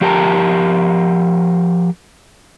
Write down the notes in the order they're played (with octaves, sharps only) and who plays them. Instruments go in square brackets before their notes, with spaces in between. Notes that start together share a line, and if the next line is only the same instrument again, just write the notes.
[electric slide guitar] F3 G4 A#4 A5 A#5